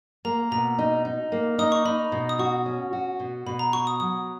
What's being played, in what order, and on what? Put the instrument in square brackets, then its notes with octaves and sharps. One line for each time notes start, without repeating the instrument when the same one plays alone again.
[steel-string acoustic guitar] A#3 [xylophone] A#5
[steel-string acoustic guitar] B2 [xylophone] A#5
[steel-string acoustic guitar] D#4
D#4
A#3
[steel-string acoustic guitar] D#4 [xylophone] D#6
[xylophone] C#6
[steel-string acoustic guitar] D#4 [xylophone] B5
[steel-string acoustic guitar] B2
[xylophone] D#6
[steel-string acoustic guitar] F#4 [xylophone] C#6
[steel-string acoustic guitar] C#4
F#4
B2
[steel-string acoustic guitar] B2 [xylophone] B5
[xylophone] A#5
[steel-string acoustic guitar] F#4 [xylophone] C#6
[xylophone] D#6
[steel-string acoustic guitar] F#3 [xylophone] D#6